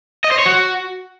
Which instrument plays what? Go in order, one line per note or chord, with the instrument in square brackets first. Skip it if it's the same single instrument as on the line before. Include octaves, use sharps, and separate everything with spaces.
[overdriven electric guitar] D#5
C5
C#5
F#4